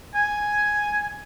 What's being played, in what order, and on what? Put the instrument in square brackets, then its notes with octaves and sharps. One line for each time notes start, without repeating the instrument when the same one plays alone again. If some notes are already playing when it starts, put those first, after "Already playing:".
[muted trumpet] G#5